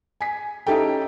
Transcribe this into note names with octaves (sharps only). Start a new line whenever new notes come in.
G#5 B6
C#4 D#4 E4 G4 A4 G5